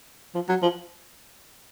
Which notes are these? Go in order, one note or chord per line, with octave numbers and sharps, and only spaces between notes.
F3
F#3
F3